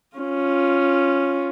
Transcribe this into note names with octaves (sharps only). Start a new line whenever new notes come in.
C#4 F4